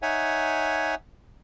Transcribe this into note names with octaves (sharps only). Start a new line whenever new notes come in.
D#4 C#5 E5 F#5 G#5